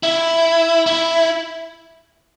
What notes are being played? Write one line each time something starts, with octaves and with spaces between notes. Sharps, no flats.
E4
E4